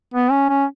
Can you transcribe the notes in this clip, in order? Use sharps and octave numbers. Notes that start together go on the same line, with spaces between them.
B3
C#4
C#4